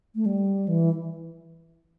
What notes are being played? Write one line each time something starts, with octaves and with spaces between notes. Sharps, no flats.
A3
G3
E3